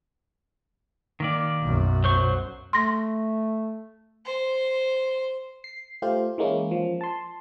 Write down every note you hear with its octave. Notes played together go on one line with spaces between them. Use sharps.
D#3 A#3 D5
B1 F#2
F#3 C5 C#6
A3 C6 A#6
C5
C7
A3 F4 G4 C5
E3 G#3 A#3 C#4 E4
F3
A5 C6